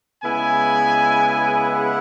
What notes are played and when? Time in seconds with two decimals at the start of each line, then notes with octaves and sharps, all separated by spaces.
0.24 C#3 G#3 B3 E4 G#5
1.70 F#5